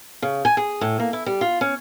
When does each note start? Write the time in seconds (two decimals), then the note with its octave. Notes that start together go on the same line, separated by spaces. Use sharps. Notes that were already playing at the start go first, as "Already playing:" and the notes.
0.22 C#3
0.45 G#5
0.57 G#4
0.81 A2
1.00 A#3
1.13 E4
1.26 G3
1.41 F4
1.61 C#4